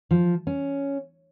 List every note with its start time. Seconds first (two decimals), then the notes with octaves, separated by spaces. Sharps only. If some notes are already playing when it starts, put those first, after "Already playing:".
0.11 F3
0.47 C#4